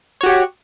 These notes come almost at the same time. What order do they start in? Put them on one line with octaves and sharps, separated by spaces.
C#5 F#4 G4 F#5